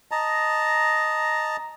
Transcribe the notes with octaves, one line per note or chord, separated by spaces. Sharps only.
D#5 A5 A#5